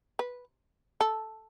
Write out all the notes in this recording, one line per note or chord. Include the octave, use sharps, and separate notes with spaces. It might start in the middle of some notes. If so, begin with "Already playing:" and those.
B4
A4